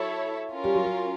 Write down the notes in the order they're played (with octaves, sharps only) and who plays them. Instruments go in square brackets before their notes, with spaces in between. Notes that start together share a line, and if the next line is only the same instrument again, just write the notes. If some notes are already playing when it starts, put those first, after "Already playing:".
Already playing: [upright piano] F#3 [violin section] E4 A4 C#5 E5
[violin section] C#4 F4 A#4
[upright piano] G3
F#3
F#3